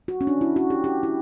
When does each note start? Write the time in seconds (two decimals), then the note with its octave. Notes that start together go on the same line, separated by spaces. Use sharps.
0.08 F#4
0.21 C#4
0.27 D4
0.41 E4
0.56 F#4
0.70 G4
0.84 G4
1.03 E4